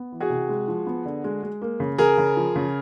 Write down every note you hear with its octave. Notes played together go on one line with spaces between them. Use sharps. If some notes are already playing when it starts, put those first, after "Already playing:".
Already playing: B3
E3
F#4 G#4
C3
G#3
F3
B3
D3
G#3
G#3
A#3
C#3
C#3 G#4 A#4
C#3
F3
C#3